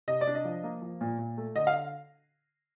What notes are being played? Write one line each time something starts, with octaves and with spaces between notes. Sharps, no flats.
C3 D#5
D5
D4
D#5
F3
A#3
F3
A#2
A#2
A3
D3 D#5
F5